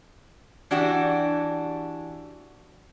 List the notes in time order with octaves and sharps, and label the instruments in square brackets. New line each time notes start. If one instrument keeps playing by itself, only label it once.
[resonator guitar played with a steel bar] E3 D4 F#4 G4